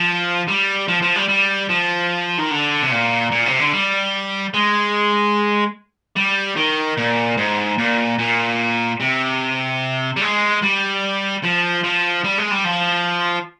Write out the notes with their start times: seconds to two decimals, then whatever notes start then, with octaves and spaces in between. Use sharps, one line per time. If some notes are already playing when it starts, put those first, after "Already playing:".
Already playing: F3
0.48 G3
0.88 F3
1.02 F3
1.16 G3
1.29 G3
1.70 F3
2.39 D#3
2.51 D3
2.83 C3
2.92 A#2
3.32 A#2
3.46 C3
3.59 D3
3.73 G3
4.54 G#3
6.16 G3
6.56 D#3
6.97 A#2
7.37 G#2
7.78 A#2
8.19 A#2
9.00 C3
10.16 G3
10.21 G#3
10.62 G3
11.43 F3
11.84 F3
12.24 G3
12.38 G#3
12.51 G3
12.65 F3